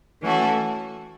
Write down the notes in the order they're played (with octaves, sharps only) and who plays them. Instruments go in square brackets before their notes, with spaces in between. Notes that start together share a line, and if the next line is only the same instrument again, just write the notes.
[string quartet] E3 A3 C#4 F#4 A4